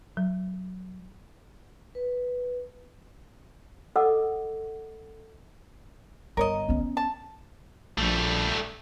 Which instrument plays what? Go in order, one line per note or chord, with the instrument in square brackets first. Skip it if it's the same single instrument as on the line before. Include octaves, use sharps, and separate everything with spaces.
[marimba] F#3
[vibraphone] B4
[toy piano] A4 D#5 F#5 D6 E6
[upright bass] G1 [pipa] A#4 C#5 D#5
[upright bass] B3 C#4
[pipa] A5
[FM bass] A#1 [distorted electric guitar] G3 A3